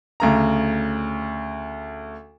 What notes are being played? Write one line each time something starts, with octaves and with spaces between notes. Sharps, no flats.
D2 C#3 A#5